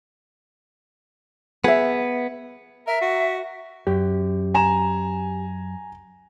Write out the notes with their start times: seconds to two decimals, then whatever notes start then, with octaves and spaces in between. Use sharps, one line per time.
1.64 B3 G#4 E5
2.87 A#4 E5
3.01 F#4
3.87 F#2 G4
4.54 G#5 A#5 E7